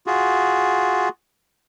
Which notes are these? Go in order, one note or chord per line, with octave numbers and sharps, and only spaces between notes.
F4 F#4 G#4